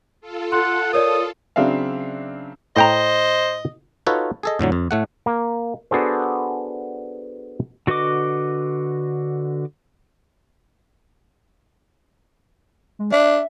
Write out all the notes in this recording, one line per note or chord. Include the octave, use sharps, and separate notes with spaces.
F4 A4
F#5 C6
A#4 C#5 D5 D#6
C#3 F#3 C4 D4 E5 F5
A2 C5 D#5 G5 A#5
D#4 F4 F#4 A4 B4 C#5
G#4 A4 D#5
F2 A2 D3 F#3
F2
A2 A3 F#5
A#3
B3 D4 F#4 G#4 A4 C5
D3 F#4 B4 D#5 D6
G#3
D4 E5